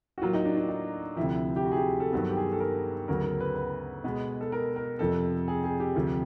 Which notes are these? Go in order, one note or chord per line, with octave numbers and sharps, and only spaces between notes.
F#4
A2 F#3 A#3 F4
D#4
D4
D4
D#4
D2 C3 F3 E4
G4
F#4
G#4
G4
A4
G2 D#3 F#3 B3 A4
G4
G#4
A4
A#4
D2 C#3 F#3 B3 A#4
A4
A#4
B4
B4
B2 G#3 B3
A4
A#4
A#4
F2 C3 F3 A4
G#4
G#4
G4
D2 C3 F3